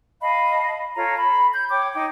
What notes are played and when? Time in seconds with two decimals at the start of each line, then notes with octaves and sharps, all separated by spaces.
0.21 D#5 F5 A5 B5
0.96 F4 A4 C#5 A#5
1.18 B5
1.54 G6
1.69 C#5 G5 D6
1.94 D#4 G5 D6